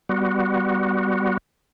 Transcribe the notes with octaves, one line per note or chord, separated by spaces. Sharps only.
G3 B3 F#4